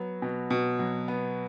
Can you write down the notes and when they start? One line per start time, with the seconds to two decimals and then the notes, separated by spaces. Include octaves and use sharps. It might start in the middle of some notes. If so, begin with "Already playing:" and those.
Already playing: F#3 B3
0.22 B2
0.50 B2
0.79 F#3
1.08 B3